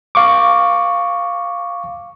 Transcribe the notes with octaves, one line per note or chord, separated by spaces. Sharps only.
F5 C#6 D6